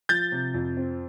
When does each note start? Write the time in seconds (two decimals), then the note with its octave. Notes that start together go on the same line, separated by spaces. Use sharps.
0.09 F3 G6 A6
0.32 C3
0.54 F2
0.77 C4